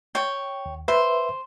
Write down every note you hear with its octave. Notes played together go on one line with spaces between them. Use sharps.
C#5 G5
D#2
B4 C5 E5